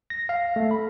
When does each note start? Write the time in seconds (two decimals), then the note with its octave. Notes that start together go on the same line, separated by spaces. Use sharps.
0.10 A#6
0.29 F5
0.56 A3
0.71 B5